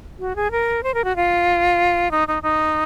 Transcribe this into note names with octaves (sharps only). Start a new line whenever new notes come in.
F#4
G#4
A#4
C5
A#4
F#4
F4
D#4
D#4
D#4